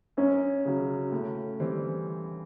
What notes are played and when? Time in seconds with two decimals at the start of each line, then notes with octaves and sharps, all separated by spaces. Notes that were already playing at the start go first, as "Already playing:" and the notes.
0.17 F#2 C#4
0.65 C#3 F#3
1.12 A2
1.60 E3 G3 C4